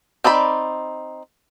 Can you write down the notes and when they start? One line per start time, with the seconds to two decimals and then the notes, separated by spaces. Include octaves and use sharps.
0.24 C4 D#4 D5 B5